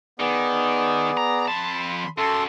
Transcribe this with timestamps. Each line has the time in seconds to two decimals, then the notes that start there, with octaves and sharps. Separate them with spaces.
0.20 D#3 B3 G#4 D5
1.17 A#5
1.48 F2 A5 B5 C6
2.18 F#2 A4 C6